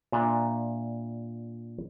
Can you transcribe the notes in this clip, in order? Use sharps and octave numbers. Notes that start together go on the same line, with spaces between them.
A#2 D4 E5 G#5